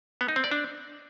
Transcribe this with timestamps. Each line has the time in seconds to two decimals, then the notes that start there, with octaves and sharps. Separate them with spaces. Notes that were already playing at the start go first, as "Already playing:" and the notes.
0.21 B3
0.28 D#4
0.36 C4
0.44 D5
0.51 D4